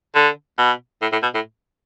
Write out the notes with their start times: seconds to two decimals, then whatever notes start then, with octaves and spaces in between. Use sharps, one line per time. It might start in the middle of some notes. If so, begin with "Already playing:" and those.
0.15 D3
0.58 B2
1.02 A2
1.12 A2
1.22 B2
1.34 A2